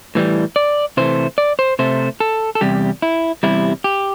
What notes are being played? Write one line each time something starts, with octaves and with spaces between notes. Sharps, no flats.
A2 E3 G3
D5
C3 E3 A3 C5
D5
C5
C3 A3 C5
A4
A4
E2 C3 G3 G4
E4
E2 C3 G3 E4
G4